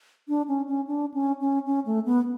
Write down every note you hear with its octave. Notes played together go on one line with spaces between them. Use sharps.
D4
C#4
C#4
D4
C#4
C#4
C#4
A3
B3